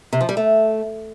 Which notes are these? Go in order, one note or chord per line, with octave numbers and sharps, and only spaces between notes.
C3
F3
G3
A3